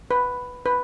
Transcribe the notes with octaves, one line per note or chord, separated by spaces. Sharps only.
B4
B4